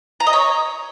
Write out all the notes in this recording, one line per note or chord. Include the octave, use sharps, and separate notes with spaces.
A#5
D#5
C#5